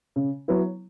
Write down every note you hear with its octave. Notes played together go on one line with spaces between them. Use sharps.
C#3
F#3 B3 E4